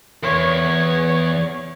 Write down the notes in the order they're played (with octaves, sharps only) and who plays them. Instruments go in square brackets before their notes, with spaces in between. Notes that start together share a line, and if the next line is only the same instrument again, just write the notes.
[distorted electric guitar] E2 [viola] C#5